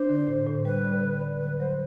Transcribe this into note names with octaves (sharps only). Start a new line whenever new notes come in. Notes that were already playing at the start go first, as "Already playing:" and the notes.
Already playing: D4 C5
D3
A2
A2
G3 B4
D3
D3
D3
F#3 B4
F#3 C5